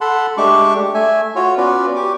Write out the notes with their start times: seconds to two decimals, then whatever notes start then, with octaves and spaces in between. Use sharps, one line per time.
0.01 A4 F#5 A5 B5 C6
0.37 G#3 A3 D4 G4 C#6 D6
0.94 A3 E5 G#5
1.36 F4 F#4 C#5
1.58 B3 C#4 F4 F#4 B4 D5
1.96 G4 C#6 D6